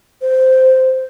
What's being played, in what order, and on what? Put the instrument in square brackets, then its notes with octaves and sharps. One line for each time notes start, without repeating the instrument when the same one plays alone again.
[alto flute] C5